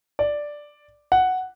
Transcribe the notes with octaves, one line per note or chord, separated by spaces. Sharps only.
D5
F#5